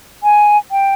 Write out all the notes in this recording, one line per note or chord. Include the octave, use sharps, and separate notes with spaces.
G#5
G5